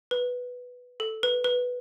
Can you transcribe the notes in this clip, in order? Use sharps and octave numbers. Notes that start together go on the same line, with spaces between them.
B4
A4
B4
B4